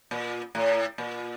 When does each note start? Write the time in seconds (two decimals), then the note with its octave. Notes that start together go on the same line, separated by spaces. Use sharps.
0.11 A#2
0.55 A2
0.98 A#2